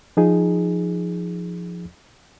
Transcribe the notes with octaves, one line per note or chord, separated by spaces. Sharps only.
F3 D#4 G#4